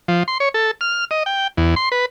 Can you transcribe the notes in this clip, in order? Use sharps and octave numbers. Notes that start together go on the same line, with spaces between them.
F3
C6
C#5
A4
F6
D#5
G5
E2
C6
B4